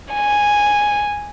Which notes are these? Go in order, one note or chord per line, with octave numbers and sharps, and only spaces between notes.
G#5